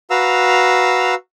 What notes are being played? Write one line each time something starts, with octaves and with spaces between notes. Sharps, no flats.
F#4 B4 F5 A#5 E6